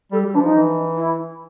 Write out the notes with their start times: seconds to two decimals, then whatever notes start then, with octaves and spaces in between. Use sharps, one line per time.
0.12 G3 A4
0.23 G4
0.26 G3
0.34 E3 D4
0.41 F3 D#4
0.55 E3
0.97 E4